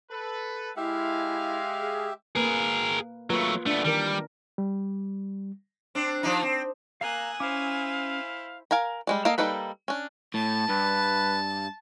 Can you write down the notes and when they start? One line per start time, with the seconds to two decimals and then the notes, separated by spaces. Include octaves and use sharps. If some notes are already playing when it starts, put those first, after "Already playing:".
0.11 A4 B4
0.77 G#3 E4 G4 E5 F5
1.80 G#4
2.35 A#3 G#4 A#4 B4
3.30 F#3 A3 A#3 F4 B4
3.66 A3 B3 D4
3.84 D#3 E3 G3 A#4
4.58 G3
5.95 C4 D4
6.23 F3 D4 D#4
6.43 C4
7.01 A#3 F5 G#5 A#5 D#6 E6 F#6
7.40 C#4 E4 C5 F5 D6
8.71 A#4 F5 G#5 A#5
9.07 G3 G#3 D5
9.25 A#3 A4 D#5 F5
9.38 G3 A#3 D#4 A4 B4
9.88 C#4 D4
10.34 A2 A5
10.69 G2 B4